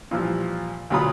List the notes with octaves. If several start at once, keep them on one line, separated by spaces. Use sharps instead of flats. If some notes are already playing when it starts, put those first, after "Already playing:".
A#2 E3 F3 G3
D2 A#2 F#3 F4 B5 D#6